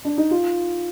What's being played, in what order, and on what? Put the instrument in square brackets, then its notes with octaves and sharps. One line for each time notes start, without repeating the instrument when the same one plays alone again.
[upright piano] D4
D#4
F4